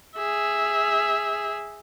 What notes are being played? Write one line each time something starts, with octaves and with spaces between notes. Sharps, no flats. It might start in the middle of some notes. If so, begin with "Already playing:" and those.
G#4 E5